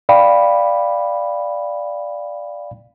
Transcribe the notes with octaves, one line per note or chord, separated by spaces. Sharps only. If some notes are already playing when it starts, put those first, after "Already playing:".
D5 F5 G5 B5